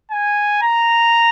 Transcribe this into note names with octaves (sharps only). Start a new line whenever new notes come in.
G#5
A#5